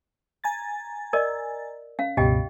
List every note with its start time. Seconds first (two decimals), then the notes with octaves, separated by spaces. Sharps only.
0.44 G#5 A#5 A6
1.13 A#4 D5 D#5
1.99 C#4 F5
2.17 C#2 G2 B2 G4 D#5 G5